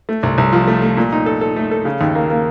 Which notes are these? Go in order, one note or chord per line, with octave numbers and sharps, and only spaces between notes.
A3
C2
C2
F3
A3
A3
A#2
D#4
A4
A4
A3
A4
C#3
D#2
A#3
A#3